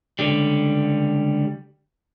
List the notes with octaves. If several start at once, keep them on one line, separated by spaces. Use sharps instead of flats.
C#2 D3 G3